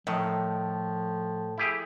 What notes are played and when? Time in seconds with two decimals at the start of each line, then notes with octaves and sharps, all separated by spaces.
0.07 A2 D#3 F3
1.58 E4 G4 G#4